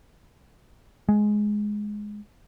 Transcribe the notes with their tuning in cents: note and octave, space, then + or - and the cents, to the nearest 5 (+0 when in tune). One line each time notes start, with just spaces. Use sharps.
G#3 +5